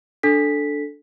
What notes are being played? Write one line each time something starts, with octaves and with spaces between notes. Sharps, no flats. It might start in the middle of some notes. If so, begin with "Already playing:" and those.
D4 A4 B6